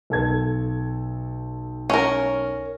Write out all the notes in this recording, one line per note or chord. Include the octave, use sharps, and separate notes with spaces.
B1 A4 G#6
C#4 A#4